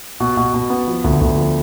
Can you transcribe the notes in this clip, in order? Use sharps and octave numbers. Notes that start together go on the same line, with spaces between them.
B2
B2
B2
B3
F3
D2
D2
F3